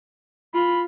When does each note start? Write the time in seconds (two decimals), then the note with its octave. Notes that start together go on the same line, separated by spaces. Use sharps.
0.54 F4 B5